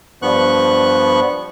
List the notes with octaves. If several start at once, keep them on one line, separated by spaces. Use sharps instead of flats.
G2 F3 B3 C#6 F#6